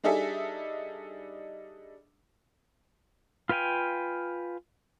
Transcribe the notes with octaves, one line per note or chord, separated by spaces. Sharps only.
G3 D4 D#4 G#4 A4 E5
F4 B4 F5 G5 G#5